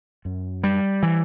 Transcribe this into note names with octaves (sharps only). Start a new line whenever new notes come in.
F#2
G3
E3